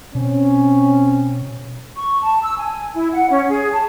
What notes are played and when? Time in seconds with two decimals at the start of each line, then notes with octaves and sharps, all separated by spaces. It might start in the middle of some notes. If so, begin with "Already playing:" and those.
0.15 B2 C4 C#4
1.97 C#6
2.22 A5
2.43 E6
2.57 G#5
2.94 E4
3.12 F#5
3.30 C#4
3.50 G#4
3.73 A5